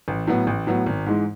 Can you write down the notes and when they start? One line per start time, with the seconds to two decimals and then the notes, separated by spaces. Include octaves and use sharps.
0.08 A1
0.27 A2 F#3 B3
0.47 A1
0.67 A2 F#3 B3
0.86 G#1
1.06 G#2 E3 G#3